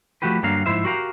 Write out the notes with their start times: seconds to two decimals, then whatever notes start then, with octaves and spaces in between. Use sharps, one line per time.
0.22 F3 A3 F#4 G4 B4
0.43 G2 D3 F#3 A#3 A#4 F5
0.66 G#2 F3 E4 C5 E5
0.85 F#4 G4 A#4 F5